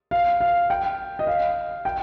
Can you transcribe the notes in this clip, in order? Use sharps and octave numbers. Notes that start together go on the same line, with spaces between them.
F5
F5
G5
D#5
F5
G5